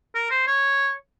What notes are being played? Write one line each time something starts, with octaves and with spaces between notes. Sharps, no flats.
A#4
C5
C#5